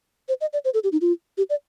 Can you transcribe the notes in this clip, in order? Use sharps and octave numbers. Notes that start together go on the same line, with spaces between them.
C5
D#5
D5
C5
A4
G4
D#4
F4
G4
D5